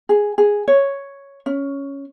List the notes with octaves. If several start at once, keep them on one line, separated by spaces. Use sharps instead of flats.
G#4
G#4
C#5
C#4